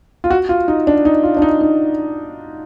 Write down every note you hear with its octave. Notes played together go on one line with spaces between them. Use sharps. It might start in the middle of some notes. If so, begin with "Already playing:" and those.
F4
F#4
F4
D#4
D4
D#4
F4
D4
D#4
D#4